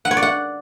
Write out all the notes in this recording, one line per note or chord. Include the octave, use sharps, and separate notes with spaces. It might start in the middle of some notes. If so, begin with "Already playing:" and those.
F#5
C#5
D5
F#5